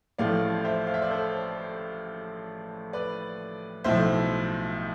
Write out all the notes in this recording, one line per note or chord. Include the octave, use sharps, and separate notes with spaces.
A1 A2 F3 A3 D5 F5
C5 E5
F5
E5
D5
A4 C5
B4 D5
B1 A2 F3 C5 E5